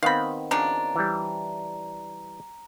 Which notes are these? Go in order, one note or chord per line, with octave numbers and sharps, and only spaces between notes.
D#3 B3 C4 F5 B5
C#3 F3 D4 A#5
E3 G3